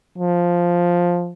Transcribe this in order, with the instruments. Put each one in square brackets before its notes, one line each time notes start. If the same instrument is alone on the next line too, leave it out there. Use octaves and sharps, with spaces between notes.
[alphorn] F3